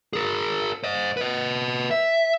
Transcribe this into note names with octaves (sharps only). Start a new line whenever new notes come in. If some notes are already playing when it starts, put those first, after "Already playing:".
G#4 A#4
C5 D#5
B4 D#5
E5